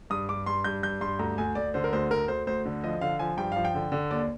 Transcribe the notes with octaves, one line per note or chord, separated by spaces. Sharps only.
G2 D#6
G2 D6
G2 C6
G2 G6
G2 G6
G2 C6
D2 A#5
D2 G#5
D2 D5
D3 C5
A#4
D2 C5
D2 A#4
D2 C5
D2 C5
D3
F3 D#5
D3 F5
F3 G#5
G2 G5
F3 F5
G5
D3
D3
D#2 D5